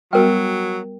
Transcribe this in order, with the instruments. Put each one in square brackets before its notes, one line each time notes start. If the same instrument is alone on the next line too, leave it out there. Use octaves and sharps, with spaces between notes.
[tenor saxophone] F#3 [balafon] G3 B3 F#4 [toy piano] A#4 G5